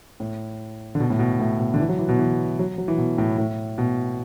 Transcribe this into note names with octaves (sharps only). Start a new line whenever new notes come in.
A2
D3
B2
A2
B2
A2
B2
D3
E3
F#3
E3
B2
E3
F#3
F#3
E3
B2
A2
A2
B2